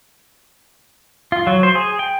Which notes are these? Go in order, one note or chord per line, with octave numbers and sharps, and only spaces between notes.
F4
F#3
C5
G#4
G5